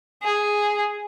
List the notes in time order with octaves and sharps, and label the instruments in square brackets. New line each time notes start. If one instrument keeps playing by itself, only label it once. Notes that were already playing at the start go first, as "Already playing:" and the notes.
[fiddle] G#4